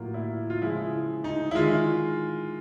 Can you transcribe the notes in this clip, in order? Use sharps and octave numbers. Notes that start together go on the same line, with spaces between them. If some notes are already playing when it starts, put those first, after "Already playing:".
Already playing: A2 F#3 A#3 F4
E4
F4
C#3 F3 G#3 E4
D#4
E4
D#3 G#3 F4